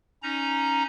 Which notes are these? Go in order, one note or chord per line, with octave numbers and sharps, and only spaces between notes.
C#4 D#4 A#5